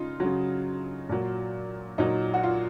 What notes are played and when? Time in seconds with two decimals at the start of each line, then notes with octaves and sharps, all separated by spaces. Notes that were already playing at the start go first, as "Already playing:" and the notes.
Already playing: C#3 D#4 F4
0.20 C#3 F#3
1.09 A#2 F#3
1.98 A#2 F#3 D#4
2.34 F#4
2.43 F4